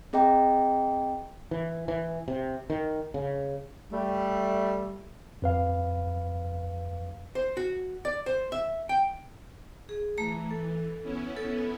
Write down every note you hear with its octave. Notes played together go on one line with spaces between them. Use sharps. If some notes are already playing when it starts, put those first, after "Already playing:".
C4 G#4 D#5 G5 A#5
E3
E3
C3
D#3
C#3
G3 A3
F2 B4 F5
C5
F#4
D5
C5
E5
G5
G#4
E3 A3 A#5
A4
B3 C#4 E4
A4